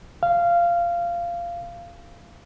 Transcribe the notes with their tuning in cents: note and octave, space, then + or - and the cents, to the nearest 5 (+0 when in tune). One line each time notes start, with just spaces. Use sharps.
F5 -15